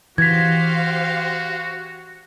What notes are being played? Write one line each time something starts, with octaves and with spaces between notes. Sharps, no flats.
E3 F#4 G4 C5 F5 G#6 B6